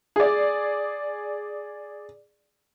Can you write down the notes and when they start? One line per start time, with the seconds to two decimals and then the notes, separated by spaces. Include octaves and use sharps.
0.16 G#4 D5